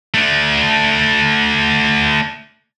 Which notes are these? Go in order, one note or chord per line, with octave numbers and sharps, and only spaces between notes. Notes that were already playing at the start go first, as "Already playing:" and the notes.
A3 D4